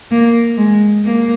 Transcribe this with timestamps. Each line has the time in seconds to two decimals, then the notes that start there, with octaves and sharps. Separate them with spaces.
0.11 A#3
0.58 G#3
1.05 A#3